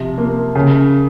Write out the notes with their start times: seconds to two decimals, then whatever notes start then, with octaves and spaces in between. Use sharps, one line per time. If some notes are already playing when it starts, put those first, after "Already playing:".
Already playing: C3 F3
0.18 A#3
0.55 C#3